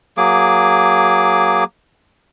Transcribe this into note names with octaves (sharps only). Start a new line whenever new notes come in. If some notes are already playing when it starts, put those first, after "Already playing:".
F#3 A#3 G#4 D6